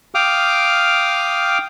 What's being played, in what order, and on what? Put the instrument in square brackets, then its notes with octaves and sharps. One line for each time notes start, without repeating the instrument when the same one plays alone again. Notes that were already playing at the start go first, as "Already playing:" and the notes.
[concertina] F5 G5 D6 D#6 F6